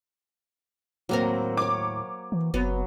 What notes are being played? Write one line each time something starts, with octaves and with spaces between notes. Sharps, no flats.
D#2 A2 F#3 A#3 C4 A#4
C#5 G#5 D6
E3
F#1 F#3 B3